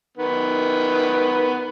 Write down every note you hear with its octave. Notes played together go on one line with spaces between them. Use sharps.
D#3 B3